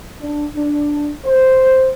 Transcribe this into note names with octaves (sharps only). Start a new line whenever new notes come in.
D4
D4
C5